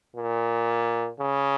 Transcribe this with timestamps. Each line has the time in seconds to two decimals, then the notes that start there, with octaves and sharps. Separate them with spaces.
0.16 A#2
1.19 C#3